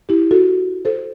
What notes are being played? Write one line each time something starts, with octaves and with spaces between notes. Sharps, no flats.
E4 G4
F#4 A4
A4 C5